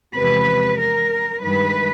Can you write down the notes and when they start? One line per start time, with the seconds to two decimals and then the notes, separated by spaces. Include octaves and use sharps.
0.15 E2 C3 F3 G#3 B4
0.78 A#4
1.41 G2 D#3 G#3 B4